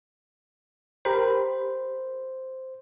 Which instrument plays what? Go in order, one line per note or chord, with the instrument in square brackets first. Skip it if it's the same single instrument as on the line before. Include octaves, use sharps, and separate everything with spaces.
[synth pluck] G4 A#4 B5 [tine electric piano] C5